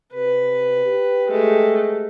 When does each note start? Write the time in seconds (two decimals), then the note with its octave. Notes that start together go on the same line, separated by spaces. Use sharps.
0.13 C3 B4
0.85 G4
1.27 G#3 A3